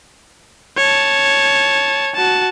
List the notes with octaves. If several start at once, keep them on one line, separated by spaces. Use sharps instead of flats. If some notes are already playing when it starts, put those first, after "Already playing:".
C#5 A5
F#4 A5